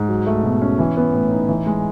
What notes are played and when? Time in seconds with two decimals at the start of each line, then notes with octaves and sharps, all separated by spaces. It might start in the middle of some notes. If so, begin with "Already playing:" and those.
Already playing: G#2
0.09 F#3
0.27 A3
0.43 B2
0.61 C#4
0.79 E3
0.97 B3
1.14 A2
1.31 D#4
1.49 E3
1.66 G#3